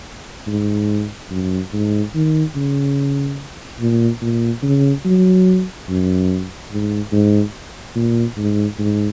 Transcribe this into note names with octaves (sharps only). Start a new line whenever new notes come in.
G#2
F#2
G#2
D#3
C#3
A#2
A#2
C#3
F#3
F#2
G#2
G#2
A#2
G#2
G#2